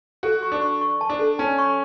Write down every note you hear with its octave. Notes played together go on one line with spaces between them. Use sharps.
F#4 A4
C#6
D4
C#6
C#6
A5
D4
A4
C#4 A5
C#6